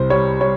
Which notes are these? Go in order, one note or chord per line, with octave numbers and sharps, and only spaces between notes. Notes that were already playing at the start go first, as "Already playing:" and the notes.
Already playing: C2 G3 C5
G3 C#5
G3 C#5